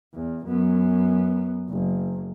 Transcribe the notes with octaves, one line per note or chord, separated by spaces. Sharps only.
E2
F#2 B3
F#1